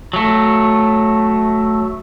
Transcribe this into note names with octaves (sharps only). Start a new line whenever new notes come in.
F#3 A3